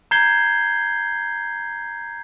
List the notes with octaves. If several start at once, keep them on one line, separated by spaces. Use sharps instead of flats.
A#5 G6 G#6 C7 G7